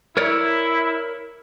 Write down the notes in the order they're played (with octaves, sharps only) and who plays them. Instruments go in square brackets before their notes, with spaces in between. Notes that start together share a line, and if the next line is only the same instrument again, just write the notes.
[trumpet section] E4 [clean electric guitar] A#4 C#5 D5